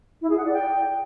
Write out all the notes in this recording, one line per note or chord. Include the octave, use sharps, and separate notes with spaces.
E4
G#4
F#5
D5
G5